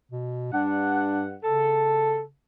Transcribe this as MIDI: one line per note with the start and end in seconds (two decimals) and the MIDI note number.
0.11 0.48 47
0.53 1.35 43
0.53 1.23 62
0.53 1.35 78
1.44 2.30 49
1.44 2.21 69